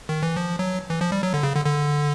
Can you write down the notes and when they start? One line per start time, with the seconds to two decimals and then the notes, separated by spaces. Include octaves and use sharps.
0.09 D#3
0.23 E3
0.37 F3
0.59 F#3
0.90 E3
1.01 F3
1.12 G3
1.23 F#3
1.34 D3
1.43 C#3
1.55 D3
1.66 D3